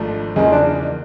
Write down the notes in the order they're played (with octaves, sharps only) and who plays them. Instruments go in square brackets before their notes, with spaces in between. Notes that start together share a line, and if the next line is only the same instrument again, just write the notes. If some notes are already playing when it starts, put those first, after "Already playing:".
Already playing: [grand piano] G#1 G#2 F3 A3 D4
[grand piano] E2 C#3 F3 A#3 [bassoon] G#3
[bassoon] D4